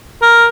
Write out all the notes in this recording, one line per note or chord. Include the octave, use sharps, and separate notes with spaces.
A#4